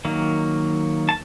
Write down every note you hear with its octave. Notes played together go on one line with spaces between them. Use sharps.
D#3 F#3 A#3
A5